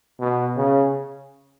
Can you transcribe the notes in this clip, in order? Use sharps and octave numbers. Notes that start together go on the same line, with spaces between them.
B2
C#3